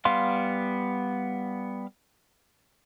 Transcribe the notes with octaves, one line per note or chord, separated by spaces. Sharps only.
G3 B3 F5 C6